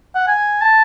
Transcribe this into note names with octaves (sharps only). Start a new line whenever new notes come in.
F#5
G#5
A5